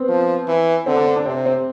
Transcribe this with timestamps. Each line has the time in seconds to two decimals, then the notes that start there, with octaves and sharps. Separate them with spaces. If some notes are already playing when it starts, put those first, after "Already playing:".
Already playing: B3 C4
0.08 F3
0.47 E3
0.86 D3 C4
0.96 D4
1.06 C4
1.16 D4
1.26 C3 C4
1.46 C4